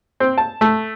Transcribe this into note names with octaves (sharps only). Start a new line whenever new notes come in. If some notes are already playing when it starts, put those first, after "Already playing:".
C4
A5
A3